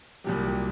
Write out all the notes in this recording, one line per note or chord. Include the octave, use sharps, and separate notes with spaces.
C2 A#2 F#3 G4